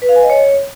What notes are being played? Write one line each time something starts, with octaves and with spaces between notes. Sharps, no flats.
B4
F5
G#5
D#5
C#5